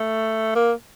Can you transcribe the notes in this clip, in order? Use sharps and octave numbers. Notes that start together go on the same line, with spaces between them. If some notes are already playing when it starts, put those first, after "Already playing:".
Already playing: A3
A#3